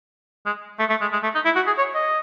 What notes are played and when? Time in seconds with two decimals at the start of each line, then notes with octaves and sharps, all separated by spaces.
0.46 G#3
0.79 A3
0.90 A3
1.01 G#3
1.13 G#3
1.23 A3
1.35 D#4
1.45 E4
1.56 F#4
1.67 G#4
1.78 C#5
1.95 D#5